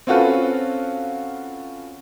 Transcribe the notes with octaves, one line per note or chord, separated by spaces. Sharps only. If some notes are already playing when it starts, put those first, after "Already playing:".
C4 C#4 F4 F#4 A4 B4